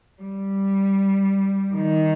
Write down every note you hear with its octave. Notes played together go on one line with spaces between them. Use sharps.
G3
D#3